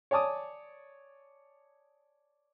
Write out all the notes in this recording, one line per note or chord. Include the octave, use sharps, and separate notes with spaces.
C#5 D5 G#5 A5 D6 D#6